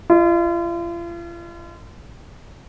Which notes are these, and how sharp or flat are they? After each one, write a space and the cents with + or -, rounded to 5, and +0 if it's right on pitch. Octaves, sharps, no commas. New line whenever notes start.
F4 -40 D#5 +0